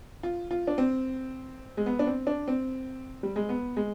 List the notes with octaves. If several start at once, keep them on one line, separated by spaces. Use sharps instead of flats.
F4
F4
D4
C4
G#3
B3
D4
C4
D4
C4
G3
G#3
B3
G#3